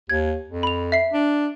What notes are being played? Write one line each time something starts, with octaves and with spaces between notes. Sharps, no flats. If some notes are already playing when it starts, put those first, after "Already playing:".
D#2 G#6
F2
B5 F7
E5 C7
D4